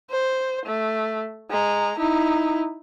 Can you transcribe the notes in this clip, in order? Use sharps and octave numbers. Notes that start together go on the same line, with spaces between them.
C5
A3
G#3 A#5
D#4 E4